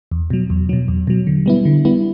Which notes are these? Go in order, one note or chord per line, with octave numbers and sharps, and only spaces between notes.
E2
B2 F#3
E2
B2 F#3
E2
B2 F#3
D3
G3 B3 E4
D3
G3 B3 E4